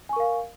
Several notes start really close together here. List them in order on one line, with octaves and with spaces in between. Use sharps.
G#5 C#6 A#4 F5